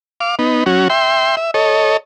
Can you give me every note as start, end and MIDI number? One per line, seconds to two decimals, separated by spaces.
0.20 0.35 77
0.20 0.35 86
0.39 0.64 59
0.39 0.64 63
0.66 0.88 54
0.66 0.88 61
0.66 0.88 66
0.90 1.35 76
0.90 1.35 79
0.90 1.35 84
1.37 1.51 76
1.54 1.97 69
1.54 1.97 73
1.54 1.97 75